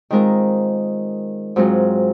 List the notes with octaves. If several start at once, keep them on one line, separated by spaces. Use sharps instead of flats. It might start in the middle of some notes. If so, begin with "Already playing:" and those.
D#3 G#3 C4 F4 A#4
G#2 F#3 C4 F4 G#4